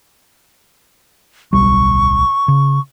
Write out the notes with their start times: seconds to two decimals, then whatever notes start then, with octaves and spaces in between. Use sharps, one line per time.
1.53 D1 B1 G3 C#6
2.48 C#3